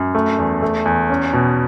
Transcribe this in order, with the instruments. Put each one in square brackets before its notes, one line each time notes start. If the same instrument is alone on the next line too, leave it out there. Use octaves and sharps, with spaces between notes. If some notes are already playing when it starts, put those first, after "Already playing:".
Already playing: [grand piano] F#2
A3
E2
A3
E2
C#4
B2